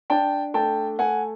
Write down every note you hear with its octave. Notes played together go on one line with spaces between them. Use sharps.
D4 G5 A5
A3 G5 A5
A3 F#5 G#5